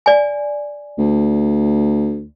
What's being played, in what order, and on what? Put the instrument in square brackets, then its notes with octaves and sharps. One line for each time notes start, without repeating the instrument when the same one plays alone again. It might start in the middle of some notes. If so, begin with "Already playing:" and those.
[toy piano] D5 G#5
[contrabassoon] D2